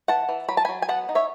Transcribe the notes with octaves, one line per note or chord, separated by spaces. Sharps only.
E3 F#5 A5
E3
F#3 B5
A5
F#3 G#5 B5
G#5
B3 F#5 A5
D#4
C#5 E5